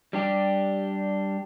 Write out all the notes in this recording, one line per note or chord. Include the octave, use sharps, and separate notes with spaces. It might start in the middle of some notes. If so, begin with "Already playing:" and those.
G3 D4 G4